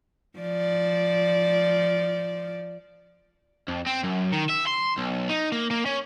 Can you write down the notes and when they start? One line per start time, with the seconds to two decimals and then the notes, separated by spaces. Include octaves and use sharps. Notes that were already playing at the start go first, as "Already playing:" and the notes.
0.39 F3 D5
3.68 F2
3.87 C4
4.04 F#2
4.33 D#3
4.49 E5
4.67 C6
4.98 B1
5.29 D#4
5.52 A#3
5.71 A#3
5.86 C#4